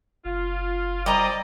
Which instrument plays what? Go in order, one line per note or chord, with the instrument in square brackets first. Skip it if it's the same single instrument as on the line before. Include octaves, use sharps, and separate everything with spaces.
[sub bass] F#1 [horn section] F4
[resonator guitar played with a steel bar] G3 A#5 [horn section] C4 D#5 [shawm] D5